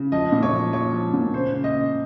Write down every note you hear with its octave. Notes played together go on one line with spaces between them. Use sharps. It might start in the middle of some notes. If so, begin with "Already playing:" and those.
Already playing: C#3
F3 D#5
A#2
C#5
F3
F3 C#5
F3
A#2
C#3 C5
C#3
D#5
C#3